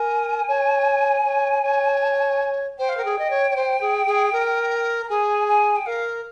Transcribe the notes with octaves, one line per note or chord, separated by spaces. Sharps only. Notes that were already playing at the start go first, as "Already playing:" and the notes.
Already playing: A#4 G#5
C#5
C#5
C#5
C5 G5
F5
A#4 G5
G#4
D#5
C#5
C#5
C5
G#4
G#4
A#4
A#5
G#4 G#5
G#5
G5
A#4 F5